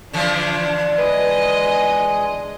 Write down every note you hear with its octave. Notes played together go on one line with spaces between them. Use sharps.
D3 E3 F3 D4
G#3 G#4 B4 D#5